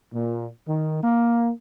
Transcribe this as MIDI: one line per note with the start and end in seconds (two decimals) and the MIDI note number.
0.13 0.46 46
0.67 1.02 51
1.03 1.50 58